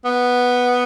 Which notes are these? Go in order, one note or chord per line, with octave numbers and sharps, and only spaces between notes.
B3